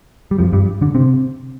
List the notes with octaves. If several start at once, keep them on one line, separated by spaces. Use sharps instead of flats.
G3
F2 F3
G2 G3
D3 D4
C3 C4